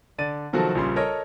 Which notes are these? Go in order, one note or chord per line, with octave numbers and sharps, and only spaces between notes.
D3 D5 A6 D#7
C3 D#3 F3 F#3 F#4 A4
A#1 A#2 C#3 G3 C6
A4 A#4 C#5 D#5